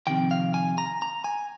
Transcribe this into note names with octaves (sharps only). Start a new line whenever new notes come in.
F2 C3 D#3 G5
F5
G#5
A#5
A#5
G#5